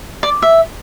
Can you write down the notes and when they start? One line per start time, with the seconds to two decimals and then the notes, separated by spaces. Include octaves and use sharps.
0.23 D5
0.42 E5